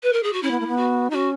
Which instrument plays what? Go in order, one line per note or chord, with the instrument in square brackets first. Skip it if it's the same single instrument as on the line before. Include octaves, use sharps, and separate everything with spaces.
[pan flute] B4
A#4
G#4
F#4
[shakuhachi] C#4 [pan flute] E4
[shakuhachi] B3
A#3
B3
[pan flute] F#4
[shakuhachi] C#4 D#4 [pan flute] F#4